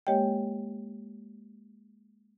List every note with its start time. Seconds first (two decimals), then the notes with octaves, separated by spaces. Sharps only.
0.07 G#3 A#3 G4 C#5 D#5 G5